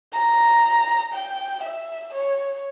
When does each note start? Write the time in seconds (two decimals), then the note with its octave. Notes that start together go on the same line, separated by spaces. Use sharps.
0.13 A#5
1.13 G5
1.64 E5
2.14 C#5